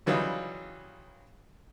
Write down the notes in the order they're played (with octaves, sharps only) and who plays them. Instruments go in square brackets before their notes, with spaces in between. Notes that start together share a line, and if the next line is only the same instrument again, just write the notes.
[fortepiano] C#3 E3 F#3 G3 D#4 F4